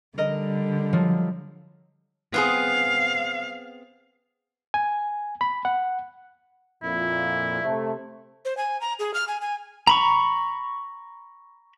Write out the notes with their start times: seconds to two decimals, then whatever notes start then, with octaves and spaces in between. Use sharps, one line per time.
0.18 D3 G3 A#4 D#5
0.93 F3 F#3
2.34 B3 C4 G#4 F5
4.74 G#5
5.41 B5
5.65 F#5
6.83 F2 A#2 E4
7.62 C3 A3
8.45 C5
8.57 G#5
8.81 A#5
8.99 G#4
9.14 F6
9.28 G#5
9.41 G#5
9.87 A#5 B5 C#6